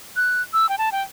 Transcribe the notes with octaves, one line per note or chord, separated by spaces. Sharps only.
F#6
E6
G5
A5
G5